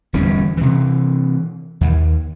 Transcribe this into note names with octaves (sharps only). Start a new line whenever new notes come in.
D1 E2 G3 C#4
C3 E3
D#2